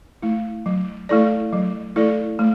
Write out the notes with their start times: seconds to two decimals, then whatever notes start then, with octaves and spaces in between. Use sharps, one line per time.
0.22 A3 E4
0.66 F#3
1.09 A3 E4 A4 D5
1.53 F#3
1.96 A3 E4 A4 D5
2.39 A3